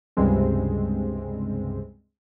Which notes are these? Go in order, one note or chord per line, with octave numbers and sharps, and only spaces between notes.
C#2 G2 C3 G3 G#3 C4